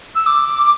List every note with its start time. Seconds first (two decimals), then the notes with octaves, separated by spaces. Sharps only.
0.15 E6
0.26 D6